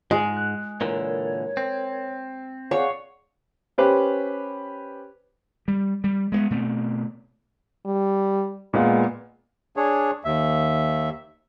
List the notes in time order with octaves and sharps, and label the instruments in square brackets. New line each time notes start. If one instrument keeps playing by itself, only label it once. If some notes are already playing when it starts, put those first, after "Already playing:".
[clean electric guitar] G#2 [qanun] G#3
[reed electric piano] F#6
[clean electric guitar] A#2 D3 E3 [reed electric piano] A#4 [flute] C#5
[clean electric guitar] C4
[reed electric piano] G#4 D5 F#5 [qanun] C#5 [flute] F5
[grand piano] C#4 G4 B4 C5
[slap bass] G3
G3
G#3 A3 B3
B2 A3 C4
[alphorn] G3
[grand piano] A#2 B3 F4 [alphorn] G#3
[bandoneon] D4 G#4 C#5
D#2 E5